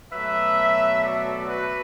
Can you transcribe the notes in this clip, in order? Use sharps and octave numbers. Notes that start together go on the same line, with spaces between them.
B2 F#3 A3 B4 E5
A4 D5
F#4 B4